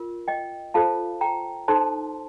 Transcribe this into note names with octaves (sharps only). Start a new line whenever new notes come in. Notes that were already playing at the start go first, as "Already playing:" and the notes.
Already playing: F4 A#4
D#5 G5
F4 A4 C5 F5 A5
G5 A#5
D#4 A4 C5 A5 C6